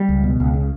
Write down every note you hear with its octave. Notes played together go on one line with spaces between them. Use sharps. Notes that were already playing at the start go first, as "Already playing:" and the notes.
Already playing: G3
C#2
B2
C#2
C#3